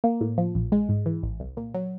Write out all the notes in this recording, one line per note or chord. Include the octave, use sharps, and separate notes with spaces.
A#3
A2
F3
A#1
G#3
G#2
E3
A1
C2
A#2
F#3